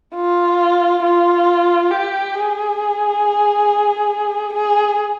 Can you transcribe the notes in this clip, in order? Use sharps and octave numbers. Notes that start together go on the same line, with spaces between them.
F4
F4
G4
G#4
G#4